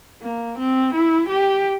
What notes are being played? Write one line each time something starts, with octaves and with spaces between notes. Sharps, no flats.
A#3
C4
E4
G4